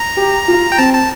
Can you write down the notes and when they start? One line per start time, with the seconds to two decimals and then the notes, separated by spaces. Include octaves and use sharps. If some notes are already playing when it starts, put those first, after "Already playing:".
Already playing: A#5
0.17 G4
0.48 F4
0.72 G5
0.78 C4 A5
0.93 A5